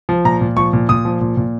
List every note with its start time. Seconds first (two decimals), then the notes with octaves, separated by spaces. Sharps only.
0.09 F3
0.25 A#2 A#5
0.41 A#2
0.57 F3 C#6
0.73 A#2
0.89 A#2 D#6
1.05 F3
1.21 A#2
1.37 A#2